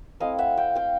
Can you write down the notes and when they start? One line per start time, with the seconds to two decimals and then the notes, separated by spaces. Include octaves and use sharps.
0.20 A3 C4 E4 D#5 F5
0.38 E5 F#5
0.57 F5 G5
0.75 F5 G5